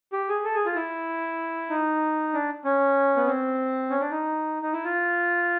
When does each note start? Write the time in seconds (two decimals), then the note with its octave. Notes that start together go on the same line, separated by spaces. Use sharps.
0.13 G4
0.29 G#4
0.44 A4
0.55 G#4
0.66 F4
0.76 E4
1.70 D#4
2.34 D4
2.65 C#4
3.16 B3
3.27 C4
3.90 C#4
4.00 D4
4.11 D#4
4.62 D#4
4.73 E4
4.84 F4